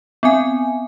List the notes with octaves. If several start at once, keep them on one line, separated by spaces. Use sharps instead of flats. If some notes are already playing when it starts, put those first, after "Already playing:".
B3 C4 G#5